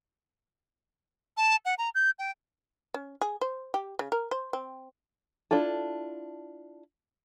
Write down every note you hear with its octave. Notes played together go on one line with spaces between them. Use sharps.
A5
F#5
A#5
G6
G5
C#4
G#4
C5
G4
C#3
A#4
C5
C4
D4 E4 F4 A4